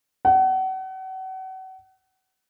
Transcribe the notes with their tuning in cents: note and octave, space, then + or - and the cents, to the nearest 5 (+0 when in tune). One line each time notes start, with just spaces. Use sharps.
F#5 +35